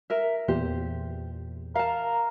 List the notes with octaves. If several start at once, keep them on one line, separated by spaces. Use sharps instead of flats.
A#4 E5
E2 A#2 G4 C5
A#4 F5 A5